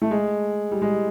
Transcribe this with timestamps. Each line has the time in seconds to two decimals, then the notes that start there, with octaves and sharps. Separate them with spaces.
0.02 A3
0.11 G#3
0.71 G3
0.82 G#3